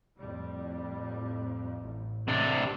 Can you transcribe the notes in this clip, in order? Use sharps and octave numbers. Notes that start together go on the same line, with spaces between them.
F2 A2 G3
A1
C3 A3 C4 D4